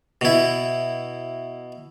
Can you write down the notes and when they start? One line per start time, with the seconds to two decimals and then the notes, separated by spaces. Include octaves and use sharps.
0.21 B2 E4